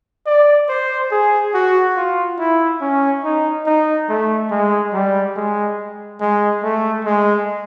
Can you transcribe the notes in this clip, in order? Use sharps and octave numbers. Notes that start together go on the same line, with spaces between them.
D5
C5
G#4
F#4
F4
E4
C#4
D#4
D#4
A3
G#3
G3
G#3
G#3
A3
G#3